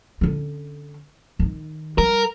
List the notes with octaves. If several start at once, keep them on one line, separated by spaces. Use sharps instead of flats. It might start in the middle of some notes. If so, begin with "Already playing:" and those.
D3 C#4
D#3 D#4
G3 A#4